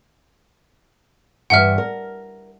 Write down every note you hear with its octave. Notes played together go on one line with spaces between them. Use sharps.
G2 E3 E5 F#5 F6
A#4